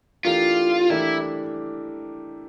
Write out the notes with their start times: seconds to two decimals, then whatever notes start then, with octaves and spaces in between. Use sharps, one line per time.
0.25 E3 A3 D4 F4 G4 A#4
0.90 E3 A3 D4 E4 G4 A#4